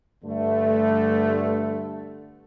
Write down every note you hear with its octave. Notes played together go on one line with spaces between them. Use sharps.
G2 D3 A3